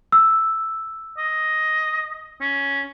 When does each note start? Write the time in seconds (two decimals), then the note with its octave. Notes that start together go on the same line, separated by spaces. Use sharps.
0.12 E6
1.18 D#5
2.41 C#4